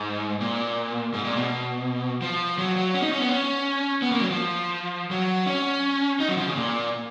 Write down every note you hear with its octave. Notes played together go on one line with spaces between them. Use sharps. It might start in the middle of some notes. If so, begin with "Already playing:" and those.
Already playing: G#2
A#2
G#2
A#2
B2
F3
F#3
F#3
C#4
D#4
C#4
B3
C#4
B3
A#3
F#3
F3
F#3
C#4
D#4
F#3
F3
C#3
A#2